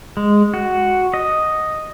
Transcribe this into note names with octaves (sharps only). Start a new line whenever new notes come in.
G#3
F#4
D#5